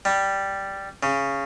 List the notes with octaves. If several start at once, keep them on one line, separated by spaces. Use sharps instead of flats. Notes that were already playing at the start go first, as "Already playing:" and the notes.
G3
C#3